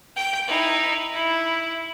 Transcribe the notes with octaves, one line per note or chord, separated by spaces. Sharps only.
G5
D#4 E4
E4